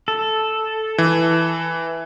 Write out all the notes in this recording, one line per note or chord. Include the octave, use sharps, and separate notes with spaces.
A4
E3